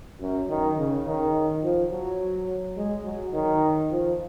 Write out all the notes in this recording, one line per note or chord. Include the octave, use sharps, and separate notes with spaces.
F#2
D#3
C#3
D#3
F3
F#3
G#3
F#3
D#3
F3